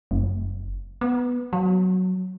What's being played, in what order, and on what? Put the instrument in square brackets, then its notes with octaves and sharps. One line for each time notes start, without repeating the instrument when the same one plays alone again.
[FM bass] F#1
B3
F#3